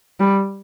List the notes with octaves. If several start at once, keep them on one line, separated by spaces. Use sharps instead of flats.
G3